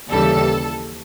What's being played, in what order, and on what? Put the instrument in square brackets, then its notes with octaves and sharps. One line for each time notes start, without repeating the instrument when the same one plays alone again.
[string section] D#2 C#3 E3 G3 A4